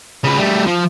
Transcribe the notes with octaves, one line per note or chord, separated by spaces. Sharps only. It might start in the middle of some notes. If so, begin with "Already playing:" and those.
C#3 B4
G3 A3
F3